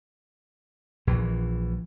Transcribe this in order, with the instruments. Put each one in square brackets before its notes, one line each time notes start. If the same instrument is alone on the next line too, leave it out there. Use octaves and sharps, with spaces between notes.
[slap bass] A#1 E3